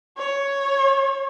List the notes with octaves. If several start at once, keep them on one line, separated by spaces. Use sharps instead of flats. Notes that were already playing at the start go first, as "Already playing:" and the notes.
C#5